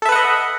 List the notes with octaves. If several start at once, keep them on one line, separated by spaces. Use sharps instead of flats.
A4 B4 D#5 E5 F#5